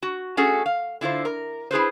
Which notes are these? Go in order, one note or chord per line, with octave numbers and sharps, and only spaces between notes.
F#4
A3 C#4 F#4 G#4 A4
F5
D3 E4 F4 C5
A#4
E4 G#4 B4 C5